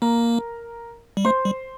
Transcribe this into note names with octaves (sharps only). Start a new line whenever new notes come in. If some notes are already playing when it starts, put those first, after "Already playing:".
A#3 A#4 A#5
G3
A3 C5 C6
G3